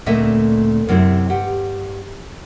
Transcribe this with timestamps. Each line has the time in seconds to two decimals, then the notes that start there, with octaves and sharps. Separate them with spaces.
0.06 D2 A#2 A3 C4 D#5 E5
0.88 F#2 C3 C4 E4
1.30 G2 G4 F#5